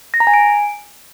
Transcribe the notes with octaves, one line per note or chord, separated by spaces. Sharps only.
A#6
A#5
G#5
D7